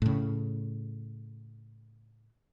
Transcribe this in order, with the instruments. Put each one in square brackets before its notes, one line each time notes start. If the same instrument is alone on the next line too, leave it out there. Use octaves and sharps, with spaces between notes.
[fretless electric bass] A2 C#3